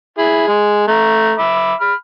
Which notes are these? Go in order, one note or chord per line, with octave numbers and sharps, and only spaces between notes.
E4 G#4
G#3
A3 A#5
E5 B5 D6
B5 F6